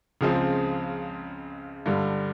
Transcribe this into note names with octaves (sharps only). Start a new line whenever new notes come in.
C#2 C#3 F3 G#3 C4
G2 D3 G3